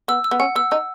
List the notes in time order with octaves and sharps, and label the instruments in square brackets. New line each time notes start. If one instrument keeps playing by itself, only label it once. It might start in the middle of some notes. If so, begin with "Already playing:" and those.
[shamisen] B3 [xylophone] E6
[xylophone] E6
[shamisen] B3
[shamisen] C#4 [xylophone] F#5
[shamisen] B3 [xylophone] E6
[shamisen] D#4 [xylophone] E6